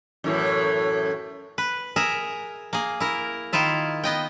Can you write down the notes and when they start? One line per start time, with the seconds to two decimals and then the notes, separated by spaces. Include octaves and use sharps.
0.24 F#2 A2 E3
1.58 B4
1.96 G#4 A#4 E5
2.73 A#3 G#4
3.00 E4 A#4
3.53 D#3 E4 F4 E5
4.04 B3 D#5 G5